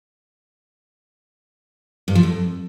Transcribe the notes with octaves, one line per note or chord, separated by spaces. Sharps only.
G2
F3
F2